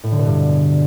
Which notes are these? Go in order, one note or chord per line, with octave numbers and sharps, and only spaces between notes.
A2
D3
B2
G2